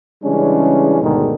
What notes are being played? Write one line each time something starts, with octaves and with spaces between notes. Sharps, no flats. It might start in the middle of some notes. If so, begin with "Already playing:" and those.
C#3 E3 G3 G#3 C#4 D4
D2 G#2 B2 D3 D#3 G#3